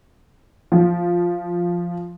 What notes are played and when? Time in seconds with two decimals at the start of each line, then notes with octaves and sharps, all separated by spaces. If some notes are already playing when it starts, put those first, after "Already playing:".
0.72 F3